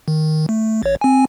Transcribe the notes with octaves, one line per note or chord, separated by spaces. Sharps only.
D#3
A3
A1 C#5
C4 G#5